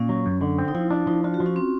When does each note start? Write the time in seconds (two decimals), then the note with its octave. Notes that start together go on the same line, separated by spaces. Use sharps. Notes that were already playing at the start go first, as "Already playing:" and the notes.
Already playing: A#2 C#4
0.09 F#3
0.26 F#2
0.41 D3
0.58 C4
0.68 D#4
0.74 F3 E4
0.91 D4 E4
1.07 F3 D#4
1.24 D4 F4
1.34 F#4
1.40 F3
1.46 C#4
1.56 C4